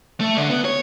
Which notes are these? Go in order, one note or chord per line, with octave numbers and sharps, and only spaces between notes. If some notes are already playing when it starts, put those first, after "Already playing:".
A3
D3
B3
C#5